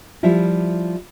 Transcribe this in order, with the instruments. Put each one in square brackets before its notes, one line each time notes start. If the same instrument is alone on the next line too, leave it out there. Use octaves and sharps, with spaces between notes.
[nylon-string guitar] F3 G3 E4 F4